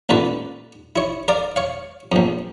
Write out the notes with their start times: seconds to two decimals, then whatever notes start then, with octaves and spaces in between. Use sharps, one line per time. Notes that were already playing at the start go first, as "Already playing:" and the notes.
0.09 A1 A#2 D3 B4
0.96 E4 C#5
1.28 A#4 D5 F5
1.56 C#5 F5
2.12 A#1 F2